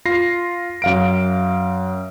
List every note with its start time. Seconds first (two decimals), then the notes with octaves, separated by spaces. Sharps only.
0.05 F4 A#6 C7
0.82 F#2 F5 D7